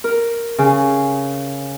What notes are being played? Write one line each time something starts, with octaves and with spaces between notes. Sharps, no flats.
A#4
C#3